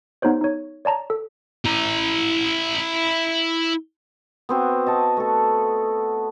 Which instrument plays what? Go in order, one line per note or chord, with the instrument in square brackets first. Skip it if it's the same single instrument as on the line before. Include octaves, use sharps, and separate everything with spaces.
[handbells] B3 D#4 G4 C5 C#5
D#4 C#5
C#5 D5 A5 A#5
A4
[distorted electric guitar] E4 A#5
[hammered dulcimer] B3 C4 F#4
D#5 A5 C#6
A3 A4